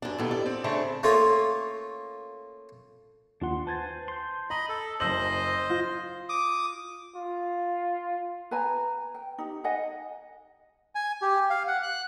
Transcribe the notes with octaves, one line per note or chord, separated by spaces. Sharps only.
F#2 D4
D#2 B2 E4 A4
D5
C4
C#3 A3 D4 C5 C#6
A3 A#3 C#4 F4
D#2 D4 F4 F#5 C6
B4 C5 G#5 A5 G#6 A6
C6 G6
D#5 A#5 B5
A4
F#1 C5 D#5 E6 F#7
F4
D6 D#6
F4
B4 G#5 A#5
G5
D#4 G4
D#5 F#5 G#5
G#5
G4
F5
F#5
F#6